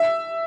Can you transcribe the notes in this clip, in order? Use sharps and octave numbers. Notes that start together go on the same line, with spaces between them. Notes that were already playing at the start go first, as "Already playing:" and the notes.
Already playing: E5